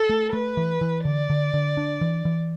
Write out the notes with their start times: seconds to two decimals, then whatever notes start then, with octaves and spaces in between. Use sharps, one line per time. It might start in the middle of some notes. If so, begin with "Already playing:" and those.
Already playing: A4
0.09 A3
0.33 A3 B4
0.57 E3
0.81 E3
1.05 D3 D5
1.30 D3
1.54 D3
1.77 D4
2.01 E3
2.25 E3